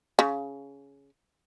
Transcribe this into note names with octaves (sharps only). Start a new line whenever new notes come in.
C#3